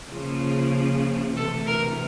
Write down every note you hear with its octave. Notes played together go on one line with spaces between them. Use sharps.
C#3 F3 A#3
D2 C3 E3 A3 A4
A#4